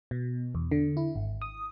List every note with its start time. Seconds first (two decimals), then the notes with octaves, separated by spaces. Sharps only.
0.11 B2
0.55 E2
0.71 D3
0.97 E4
1.16 G#1
1.42 D#6